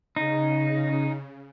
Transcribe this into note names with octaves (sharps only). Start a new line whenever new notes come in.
C#3 D#4